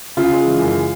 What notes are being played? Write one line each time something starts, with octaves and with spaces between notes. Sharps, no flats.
C#3 F4
G#3
E3
F#2